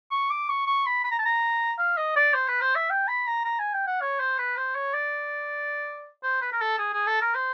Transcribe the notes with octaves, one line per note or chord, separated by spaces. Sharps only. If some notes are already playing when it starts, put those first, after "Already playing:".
C#6
D6
C#6
C#6
B5
B5
A#5
A5
A#5
F5
D#5
D5
C5
B4
C5
E5
G5
B5
A#5
A#5
G#5
G5
F#5
C#5
C5
B4
C5
C#5
D5
C5
B4
A#4
A4
G#4
G#4
A4
A#4
C5